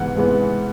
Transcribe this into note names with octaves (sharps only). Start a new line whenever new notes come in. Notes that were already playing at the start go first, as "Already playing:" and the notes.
Already playing: G#2 E3 B3 F#5
E3 G#3 B3